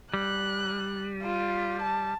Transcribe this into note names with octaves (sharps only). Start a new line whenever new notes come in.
G3 F#6
F4
A5